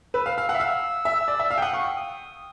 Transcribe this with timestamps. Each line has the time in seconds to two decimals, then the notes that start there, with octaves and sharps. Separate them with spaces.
0.14 B4 E6
0.26 F5
0.38 F5
0.49 F#5
0.55 E5
0.60 F5
1.05 E5
1.28 D5
1.40 E5
1.51 F5
1.58 G5
1.62 F#5 D#6
1.73 F5 C#6
1.85 G5
1.96 D#6